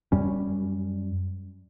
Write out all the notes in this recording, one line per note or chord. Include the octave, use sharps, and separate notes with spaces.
F#2 G3 C#4